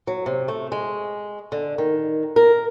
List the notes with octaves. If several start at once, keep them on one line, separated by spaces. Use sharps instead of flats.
F#3
C3
A3
G#3
D3
D#3
A#4